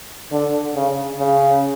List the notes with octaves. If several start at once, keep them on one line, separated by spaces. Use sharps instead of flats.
D3
C#3
C#3